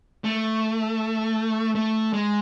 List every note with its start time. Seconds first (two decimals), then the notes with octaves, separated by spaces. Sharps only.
0.24 A3
1.75 A3
2.13 G#3